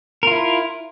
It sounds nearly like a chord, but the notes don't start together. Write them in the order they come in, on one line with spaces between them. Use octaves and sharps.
A#4 F4 E4